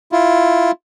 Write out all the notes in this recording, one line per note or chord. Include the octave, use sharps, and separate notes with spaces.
E4 F4